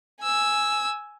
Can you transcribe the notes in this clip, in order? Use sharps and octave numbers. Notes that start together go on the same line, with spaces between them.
G#5 E6